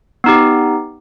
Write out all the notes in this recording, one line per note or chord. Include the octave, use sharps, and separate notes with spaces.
B3 D#4 G4